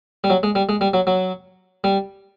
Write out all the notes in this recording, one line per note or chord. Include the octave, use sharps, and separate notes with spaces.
G3
F#3
G#3
G3
G#3
G3
F#3
F#3
G3